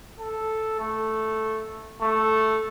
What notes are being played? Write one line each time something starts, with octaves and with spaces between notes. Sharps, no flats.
A4
A3
A3